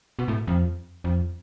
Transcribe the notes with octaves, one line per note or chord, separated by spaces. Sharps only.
B2
A2
F2
F2